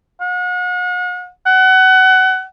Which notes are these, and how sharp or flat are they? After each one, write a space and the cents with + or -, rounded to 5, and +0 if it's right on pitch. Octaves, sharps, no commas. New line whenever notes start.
F#5 -40
F#5 +25